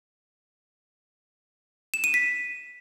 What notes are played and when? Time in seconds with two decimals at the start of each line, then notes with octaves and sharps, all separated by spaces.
1.94 E7
2.04 D#7
2.14 B6